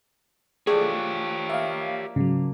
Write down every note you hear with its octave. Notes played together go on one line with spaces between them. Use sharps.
F3 A3 D4 G4 G#4 C#5
A#3 E5 F5
G#2 C#3 F#3